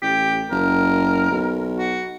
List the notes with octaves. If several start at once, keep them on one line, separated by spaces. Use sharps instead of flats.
A1 G4
F#1 A#4
B1
F#4